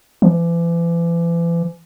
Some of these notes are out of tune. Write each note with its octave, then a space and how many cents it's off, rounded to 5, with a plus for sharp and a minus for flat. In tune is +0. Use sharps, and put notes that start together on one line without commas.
E3 +40